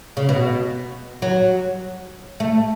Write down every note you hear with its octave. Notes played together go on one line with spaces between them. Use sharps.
C#3
B2
F#3
A3